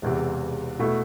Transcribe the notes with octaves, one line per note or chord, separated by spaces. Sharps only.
E1 E2 C3
B2 A3 E4